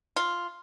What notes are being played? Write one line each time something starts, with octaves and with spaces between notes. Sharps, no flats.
F4